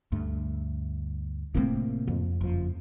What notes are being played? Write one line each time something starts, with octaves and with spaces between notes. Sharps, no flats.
D2 G2 A3
A2 C3 A3 A#3 C4
F2
F#1 F3